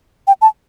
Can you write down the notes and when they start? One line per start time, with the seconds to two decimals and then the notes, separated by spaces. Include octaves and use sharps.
0.27 G5
0.42 A5